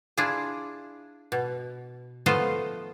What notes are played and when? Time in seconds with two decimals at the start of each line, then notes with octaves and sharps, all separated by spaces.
0.17 D4 E4 F4 G#4
1.32 B2
2.26 F3 A3 B3 F4 D#5 F5